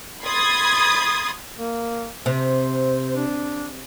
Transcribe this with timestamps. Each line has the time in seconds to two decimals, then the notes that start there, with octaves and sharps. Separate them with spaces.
0.24 B5 C6 D#6 G#6 A6
1.58 A#3
2.26 C3 C5
3.16 D4